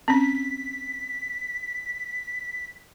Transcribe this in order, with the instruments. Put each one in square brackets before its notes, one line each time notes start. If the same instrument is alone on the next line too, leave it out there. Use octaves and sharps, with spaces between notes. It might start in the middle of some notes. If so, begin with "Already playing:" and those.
[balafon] C4 C#4 [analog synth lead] B6